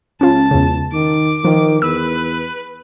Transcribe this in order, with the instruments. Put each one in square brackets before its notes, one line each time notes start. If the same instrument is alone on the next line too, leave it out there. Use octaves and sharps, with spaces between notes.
[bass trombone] C#2 [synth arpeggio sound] C#4 F4 [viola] A5
[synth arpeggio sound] E2 C#3
[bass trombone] D#3 [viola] D6
[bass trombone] D#3 [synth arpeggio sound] F3
[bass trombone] E2 [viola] B4 [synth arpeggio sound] E6